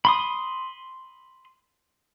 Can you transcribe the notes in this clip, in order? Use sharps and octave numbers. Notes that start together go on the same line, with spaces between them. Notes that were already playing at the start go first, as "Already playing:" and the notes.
B5 C6 D#6